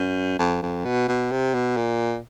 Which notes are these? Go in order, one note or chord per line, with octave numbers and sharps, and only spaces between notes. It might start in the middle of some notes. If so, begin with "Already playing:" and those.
Already playing: F#2
F2
F2
B2
B2
C3
B2
A#2